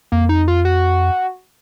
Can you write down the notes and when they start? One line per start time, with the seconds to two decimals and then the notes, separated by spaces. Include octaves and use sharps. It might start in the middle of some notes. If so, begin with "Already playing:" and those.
0.12 F2 A#3
0.29 D#4
0.48 F4
0.65 F#4